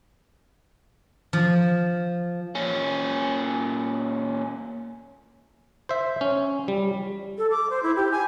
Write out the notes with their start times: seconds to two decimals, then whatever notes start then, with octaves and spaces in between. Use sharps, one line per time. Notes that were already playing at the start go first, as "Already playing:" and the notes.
1.33 F3
2.55 A#2 C#4
5.89 C5 E5
6.21 C#4
6.68 G3
7.38 A4
7.51 D6
7.70 C5
7.83 E4
7.96 G4
8.12 G#5